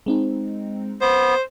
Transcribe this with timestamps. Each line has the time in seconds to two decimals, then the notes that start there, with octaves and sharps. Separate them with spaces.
0.06 G#3 C4 D#4
1.01 B3 C5